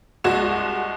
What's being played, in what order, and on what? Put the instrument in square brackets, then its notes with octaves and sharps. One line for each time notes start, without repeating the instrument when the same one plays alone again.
[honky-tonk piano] C2 G#3 F#4 E7